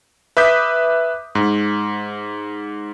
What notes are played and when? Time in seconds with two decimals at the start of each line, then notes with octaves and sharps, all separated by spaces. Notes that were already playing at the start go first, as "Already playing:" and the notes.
0.37 B4 E5 D6 D#6 G6 B6
1.35 G#2